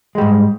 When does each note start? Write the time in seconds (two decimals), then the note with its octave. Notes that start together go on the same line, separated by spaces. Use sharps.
0.15 G#3
0.18 G3
0.21 G#2